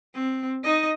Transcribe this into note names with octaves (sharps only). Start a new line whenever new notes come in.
C4
D#4 D#5